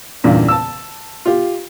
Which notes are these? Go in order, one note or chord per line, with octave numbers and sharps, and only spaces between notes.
E2 G2 A#2 C#3
A5 E6
F4 G4